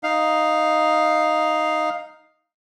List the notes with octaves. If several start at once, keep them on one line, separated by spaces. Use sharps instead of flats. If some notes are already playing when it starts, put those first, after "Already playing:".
D#4 F5